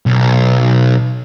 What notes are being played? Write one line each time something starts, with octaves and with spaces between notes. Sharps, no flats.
B1